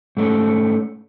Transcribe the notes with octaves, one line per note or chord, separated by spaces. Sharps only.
G#2 A3 C#4